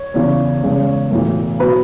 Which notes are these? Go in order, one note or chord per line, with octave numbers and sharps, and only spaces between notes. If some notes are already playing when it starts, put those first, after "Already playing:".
Already playing: C#5
E2 C#3 E3
E2 C#3 G#3
B1 A2 E3
B2 F#3 B4 B5